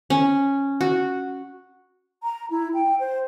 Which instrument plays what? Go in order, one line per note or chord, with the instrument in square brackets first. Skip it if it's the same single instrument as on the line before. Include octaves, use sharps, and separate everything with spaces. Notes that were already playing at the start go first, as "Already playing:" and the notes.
[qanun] C#4
F#4
[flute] A#5
E4
G5
C5